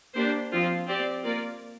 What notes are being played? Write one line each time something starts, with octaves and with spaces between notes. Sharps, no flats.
A#3 D4 G4 C5
F3 C4 F4
C4 G4 D5
A#3 F4 A#4 D5